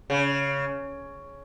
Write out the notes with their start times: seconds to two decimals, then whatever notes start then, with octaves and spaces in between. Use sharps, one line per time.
0.10 C#3